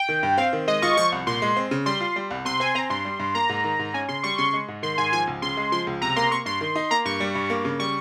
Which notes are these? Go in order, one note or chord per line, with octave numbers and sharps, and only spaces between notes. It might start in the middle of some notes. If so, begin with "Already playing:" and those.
Already playing: G5
D#3
G2
C4 F5
D#3
G#3 D#5
F4 C#6
F3 C#6
C2
A#2 C6
G#3
C4
C#3
G3 C6
F4
G3
C2
C3 C6
C4 G#5
C4 A#5
G2 C6
G3
G2
A#3 A#5
G#2
D#3
G#2
C#4 G#5
C#3 C6
G3 C#6
C#3 C6
G#3
G#2
D#3 C6
G#2 G#5
F3 G#5
C#2
C#3 C6
G#3
F3 C6
C#2
C3 A#5
A#3 C6
A#3 C#6
G2 C6
D#3
D#4
A#3 A#5
G2 C#6
G3
G2
A#3
C#3
G3 C#6